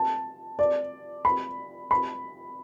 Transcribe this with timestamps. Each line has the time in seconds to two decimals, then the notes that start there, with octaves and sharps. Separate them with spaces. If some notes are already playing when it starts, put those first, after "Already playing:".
Already playing: A5
0.59 D5
1.25 B5
1.91 B5